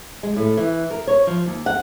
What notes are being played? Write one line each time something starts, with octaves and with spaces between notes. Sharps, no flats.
G#3
A2
E3
A#4
C#5
F3
D#2
F#5